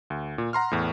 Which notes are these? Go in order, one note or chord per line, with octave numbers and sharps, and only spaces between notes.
D2
A#2
F#5 A#5 C6 F6
E2 A2